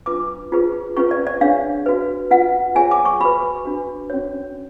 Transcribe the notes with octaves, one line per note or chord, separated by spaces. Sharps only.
D4 F4 B4 D6
F4 G#4 B4
C#4 F4 G#4 B4 C#6
D5
D5
D4 G#4 C#5 F5
F#4 B4
F4 B4 F#5
F4 G#4 C#5 G#5
D6
C#6
F#4 B4 B5
D4 F#4 B4
C#4 F#4 C#5